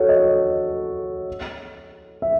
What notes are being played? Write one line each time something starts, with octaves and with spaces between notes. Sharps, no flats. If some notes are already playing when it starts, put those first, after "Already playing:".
Already playing: F#4 A4 C#5
D#5
E5